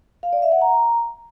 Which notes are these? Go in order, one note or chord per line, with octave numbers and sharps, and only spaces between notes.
F5
D5
E5
F#5
A#5